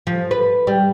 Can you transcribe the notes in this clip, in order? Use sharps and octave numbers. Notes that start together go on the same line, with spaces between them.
F3
B4
G3